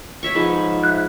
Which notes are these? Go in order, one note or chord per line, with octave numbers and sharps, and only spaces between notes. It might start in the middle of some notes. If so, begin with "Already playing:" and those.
C#5 E5 C#6
G#2 F3 B4
E5 F#6